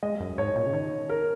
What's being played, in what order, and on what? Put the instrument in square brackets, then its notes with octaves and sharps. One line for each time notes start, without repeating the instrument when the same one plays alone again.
[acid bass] G#3 [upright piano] D#5
[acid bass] F#2
[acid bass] G#2 [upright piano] C#5
[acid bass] A#2
C#3
[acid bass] D#3 [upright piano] C#5
[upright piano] A#4